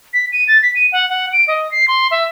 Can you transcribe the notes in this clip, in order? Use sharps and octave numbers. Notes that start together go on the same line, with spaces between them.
B6
D#7
A6
B6
D#7
F#5
F#5
D7
D#5
C7
C6
E5